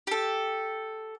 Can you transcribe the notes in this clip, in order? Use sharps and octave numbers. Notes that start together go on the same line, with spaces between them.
G4 A4